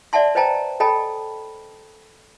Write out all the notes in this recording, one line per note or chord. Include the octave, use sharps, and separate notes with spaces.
D5 E5 F#5 A5 C6
B4 C5 D#5 G5 A5 A#5
A4 D#5 G5 A5 B5